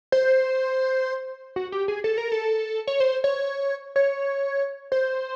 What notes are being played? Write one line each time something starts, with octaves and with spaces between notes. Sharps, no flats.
C5
F#4
G4
G#4
A4
A#4
A4
C#5
C5
C#5
C#5
C5